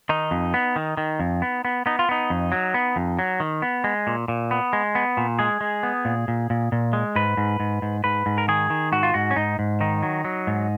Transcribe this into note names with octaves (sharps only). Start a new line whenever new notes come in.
D#3 D#4
F2
B3
D#3
D#3
F2
B3
B3
B3 D#4
F4
B3 D#4
F2
F#3
B3
F2
F#3
D#3
B3
G#3
A#2
A#2
B3
G#3
B3
A#2
G#3 G#4
G#3
B3
A#2
A#2
A#2
A#2
G#3
G#2 B4
G#2
G#2
G#2
G#2 B4
G#2
A#4
D#3 G#4
D#3
G#2 F#4
F4
G#2 F#4
C#4
G#2 D#4
G#2
D#3 D#4
F#3
F#3
G#2